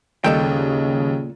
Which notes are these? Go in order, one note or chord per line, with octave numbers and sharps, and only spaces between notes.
D#2 A#2 C#3 G3 A4 D#5 G5